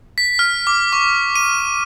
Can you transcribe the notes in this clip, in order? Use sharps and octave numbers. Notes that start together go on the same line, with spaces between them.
B6
F6
D6
C#6
D#7